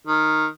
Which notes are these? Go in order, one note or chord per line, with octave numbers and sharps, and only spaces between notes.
D#3